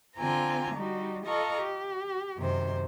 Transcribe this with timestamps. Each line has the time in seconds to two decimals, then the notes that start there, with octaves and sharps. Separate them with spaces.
0.16 D3 C4 F4 G#5 A#5
0.74 G3 D#4 F#4
1.25 F4 A4 D#5 F5 A#5 C#6
1.61 G4
2.37 F#2 C3 D#3 C5